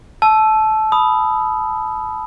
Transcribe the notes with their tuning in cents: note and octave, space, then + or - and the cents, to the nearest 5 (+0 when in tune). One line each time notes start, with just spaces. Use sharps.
A5 -20 E6 +5
B5 +0 D#6 +0